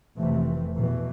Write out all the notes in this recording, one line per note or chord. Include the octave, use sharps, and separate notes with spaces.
F1 C3 E3 A3
E2 B2 E3